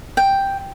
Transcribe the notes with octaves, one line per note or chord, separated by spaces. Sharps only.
G5